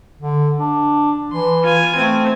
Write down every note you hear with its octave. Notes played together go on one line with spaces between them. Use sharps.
D3
D4
E3 C6
F4 G#5
A3 C4